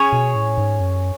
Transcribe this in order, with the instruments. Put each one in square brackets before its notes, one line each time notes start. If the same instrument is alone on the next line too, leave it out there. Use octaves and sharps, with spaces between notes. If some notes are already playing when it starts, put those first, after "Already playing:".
Already playing: [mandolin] C#4 G#4 C#5
[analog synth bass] B2
A2
G#2
F#2